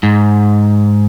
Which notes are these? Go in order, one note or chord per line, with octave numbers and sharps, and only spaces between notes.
G#2